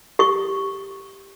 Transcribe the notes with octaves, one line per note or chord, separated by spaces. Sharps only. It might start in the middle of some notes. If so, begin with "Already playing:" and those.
G4 C#6